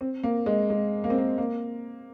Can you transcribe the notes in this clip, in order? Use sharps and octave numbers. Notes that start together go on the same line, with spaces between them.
C4
A#3
G#3
G#3
A#3
C4
A#3
A#3